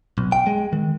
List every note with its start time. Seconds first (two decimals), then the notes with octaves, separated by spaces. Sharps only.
0.18 B1
0.32 G5
0.47 G#3
0.73 D#3